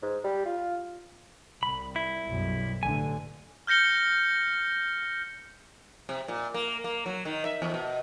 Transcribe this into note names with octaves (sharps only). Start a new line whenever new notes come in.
G#2
G3
F4
C2 B5
E4
B1 F#2 G3
A1 D3 A3 G#5
F6 G6 A#6 C#7 G7
C3
A#2
A#3
A#3
F#3
D#3
E5
E2
B2